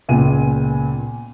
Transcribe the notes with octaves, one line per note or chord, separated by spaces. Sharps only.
C#2 A#2 B3 G5 G#5 D#7